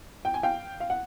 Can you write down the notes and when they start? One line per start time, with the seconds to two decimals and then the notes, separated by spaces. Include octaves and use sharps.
0.25 G5
0.34 G#5
0.43 F5 G5
0.80 F5
0.90 F#5